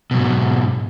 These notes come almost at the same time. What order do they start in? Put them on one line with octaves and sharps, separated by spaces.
B2 F#3 G#2